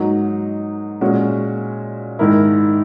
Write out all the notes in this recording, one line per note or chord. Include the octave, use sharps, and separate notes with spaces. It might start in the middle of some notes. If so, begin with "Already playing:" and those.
Already playing: G#2 F#3 A#3 D#4
A#2 G#3 C#4 F#4
G#2 D#3 A#3 E4 A#4